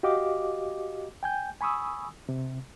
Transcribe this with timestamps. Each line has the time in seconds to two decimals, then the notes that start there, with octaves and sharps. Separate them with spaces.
0.03 F#4 G4 D#5 F5 D6
1.23 G5 G#5 G6
1.61 G#5 B5 C#6 D#6 E6
2.29 C3